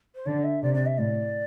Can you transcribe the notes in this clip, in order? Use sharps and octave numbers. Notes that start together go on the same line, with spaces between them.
C5
D3 D5
E5
C3 D5
D5
E5
A2 D5